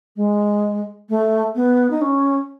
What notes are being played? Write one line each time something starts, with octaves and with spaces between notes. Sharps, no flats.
G#3
A3
B3
D#4
C#4